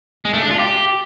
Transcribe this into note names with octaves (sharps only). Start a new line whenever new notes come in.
G#3
A3
D4
F4
G4